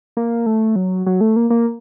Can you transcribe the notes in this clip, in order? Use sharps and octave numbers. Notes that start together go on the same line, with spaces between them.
A#3
A3
F#3
F#3
A3
A#3
A#3